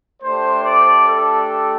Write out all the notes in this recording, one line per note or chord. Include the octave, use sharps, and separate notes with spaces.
A3 D4 G4 C5
D5
A4